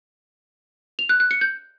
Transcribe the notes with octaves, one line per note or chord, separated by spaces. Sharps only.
F7
F#6
F#6
C#7
G6